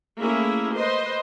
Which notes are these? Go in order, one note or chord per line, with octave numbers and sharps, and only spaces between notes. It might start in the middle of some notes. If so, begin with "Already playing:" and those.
A3 A#3 C#4 E4 G#4 E5
B4 C5 D#5 C6